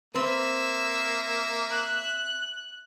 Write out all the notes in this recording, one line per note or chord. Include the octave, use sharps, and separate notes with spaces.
A#3 C4 B4 E5 E6
F#6